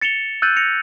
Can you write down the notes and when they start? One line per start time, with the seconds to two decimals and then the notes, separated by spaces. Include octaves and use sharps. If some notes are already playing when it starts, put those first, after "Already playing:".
0.02 A6 C#7 E7 F7 G7
0.42 E6 F#6 G6 A6 D#7 F#7
0.57 A#6 C#7 F7